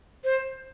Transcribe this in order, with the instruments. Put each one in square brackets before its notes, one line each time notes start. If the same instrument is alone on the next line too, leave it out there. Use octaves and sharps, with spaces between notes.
[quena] C5